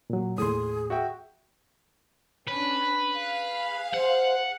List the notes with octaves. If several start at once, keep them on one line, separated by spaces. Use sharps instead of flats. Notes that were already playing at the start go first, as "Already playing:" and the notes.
A#2 F#3
D#2 A2 G#4 C6 D#6
F#4 E5 G5
C#4 D4 B4
G#4 F5
C5 F#5